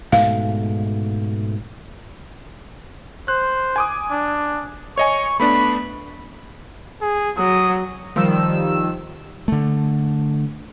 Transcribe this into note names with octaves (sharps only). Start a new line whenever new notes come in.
G#2 B2 A3 F5
C5 F#6
G#5 D6 D#6
D4
C#5 D#5 G#5 C#6
A3 B3 D4 B5
G#4
F#3 D#6
D#3 F3 G3 E6
D3 A3